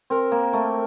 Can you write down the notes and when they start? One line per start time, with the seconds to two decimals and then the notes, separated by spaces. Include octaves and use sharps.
0.10 C4 A#4
0.32 A#3
0.53 A3